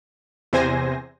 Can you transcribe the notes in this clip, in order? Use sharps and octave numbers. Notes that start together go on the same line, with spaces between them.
E2 C3 C5 G#5 A#6